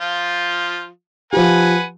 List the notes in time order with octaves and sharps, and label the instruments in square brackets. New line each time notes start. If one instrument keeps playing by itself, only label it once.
[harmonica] F3 F4
[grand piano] F3 G4 [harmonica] B4 F#5 G#5